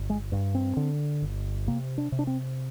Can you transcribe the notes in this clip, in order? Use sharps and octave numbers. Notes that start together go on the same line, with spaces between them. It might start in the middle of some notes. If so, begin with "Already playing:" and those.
Already playing: G1
G#3
G2
C4
D3
G1
C3 A#3
D4
C3
D4
C4